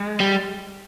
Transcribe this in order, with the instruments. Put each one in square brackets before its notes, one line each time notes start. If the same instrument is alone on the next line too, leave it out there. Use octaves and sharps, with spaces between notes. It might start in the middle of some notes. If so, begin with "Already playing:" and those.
Already playing: [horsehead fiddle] G#3
[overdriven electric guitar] G3